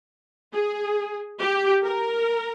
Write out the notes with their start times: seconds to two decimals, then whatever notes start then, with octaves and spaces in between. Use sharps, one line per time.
0.53 G#4
1.39 G4
1.83 A#4